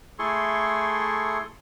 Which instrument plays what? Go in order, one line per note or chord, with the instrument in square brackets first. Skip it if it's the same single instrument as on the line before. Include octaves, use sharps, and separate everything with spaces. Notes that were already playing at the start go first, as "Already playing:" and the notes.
[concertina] A3 E4 G#4 A4 C6 C#6